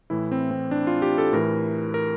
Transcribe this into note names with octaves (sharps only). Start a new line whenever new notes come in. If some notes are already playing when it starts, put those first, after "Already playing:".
A2 E3 E4
C4
C4
D4
F4
G4
A4
A2 E3 A#4
A#4